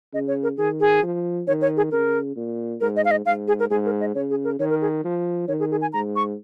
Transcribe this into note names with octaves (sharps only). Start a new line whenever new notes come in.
C#3 D#5
C#5
A#4
D#3 G#4
G#4
F3
D#3 C#5
C#5
G#4
C#3 A#4
A#2
G#2 A#4
D#5
F5
D#5
G#2 F5
G#4
A#4
G#2 G#4
A#4
D#5
C#3 C#5
G#4
A#4
D#3 C#5
A#4
G#4
F3
D#3 C#5
G#4
G#4
G#5
G#2 A#5
C#6